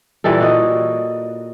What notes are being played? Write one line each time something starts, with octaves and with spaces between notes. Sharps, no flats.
A#2 E3 G3 A4
F#4 D#5